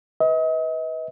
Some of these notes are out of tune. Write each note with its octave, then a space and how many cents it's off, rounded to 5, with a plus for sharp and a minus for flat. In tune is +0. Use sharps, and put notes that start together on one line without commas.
B4 +0 D#5 +40